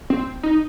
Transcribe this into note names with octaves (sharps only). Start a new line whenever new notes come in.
C4
D#4